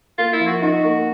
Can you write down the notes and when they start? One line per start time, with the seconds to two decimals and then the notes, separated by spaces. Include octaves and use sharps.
0.18 A#3 F4
0.33 E4
0.40 F3
0.47 F#4
0.62 D#4 F#4
0.84 A#3